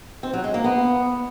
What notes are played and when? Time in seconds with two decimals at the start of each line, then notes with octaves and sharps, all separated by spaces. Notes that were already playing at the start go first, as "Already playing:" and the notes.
0.23 C4
0.33 F#3
0.44 G#3
0.54 A#3
0.64 B3